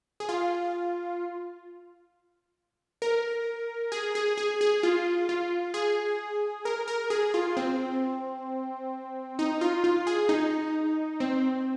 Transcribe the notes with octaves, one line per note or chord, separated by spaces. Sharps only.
G#4
F4
A#4
G#4
G#4
G#4
G#4
F4
F4
G#4
A#4
A#4
G#4
F4
C4
D#4
F4
F4
G#4
D#4
C4